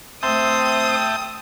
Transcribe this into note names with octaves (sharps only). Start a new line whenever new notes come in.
A3 C4 E5 G5 A5 C6 D#6